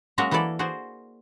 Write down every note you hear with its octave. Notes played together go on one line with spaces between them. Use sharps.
F#3 G#3 A#3 C#4 F#4 A#4
E3 A#3 E4 A4 D5
F#4 G#4 C5 D5